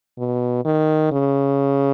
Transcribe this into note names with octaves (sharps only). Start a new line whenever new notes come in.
B2
D#3
C#3